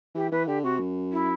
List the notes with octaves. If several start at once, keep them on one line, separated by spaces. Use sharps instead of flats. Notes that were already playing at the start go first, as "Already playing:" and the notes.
E3 G4
E3 B4
D3 G4
C3 F#4
F#2
E4